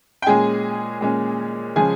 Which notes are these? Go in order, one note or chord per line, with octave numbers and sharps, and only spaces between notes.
G5
A#2 G#3 C#4 G#4 G#5
A#2 G#3 C#4
C#3 F3 G#3 C#4 G#4 G#5